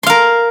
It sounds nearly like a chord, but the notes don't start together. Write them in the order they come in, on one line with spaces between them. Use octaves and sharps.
C6 F5 A#4